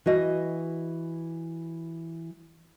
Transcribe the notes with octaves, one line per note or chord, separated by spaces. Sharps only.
E3 F#4 D#5